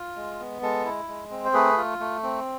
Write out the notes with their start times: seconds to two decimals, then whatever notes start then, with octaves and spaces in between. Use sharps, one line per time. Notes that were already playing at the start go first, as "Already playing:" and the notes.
Already playing: F4
0.16 G#3
0.40 B3
0.62 G#3 A4
0.85 E4
1.08 G#3
1.31 C4
1.45 C5
1.54 A3 G#4 B4
1.77 F4
2.00 A3
2.23 C4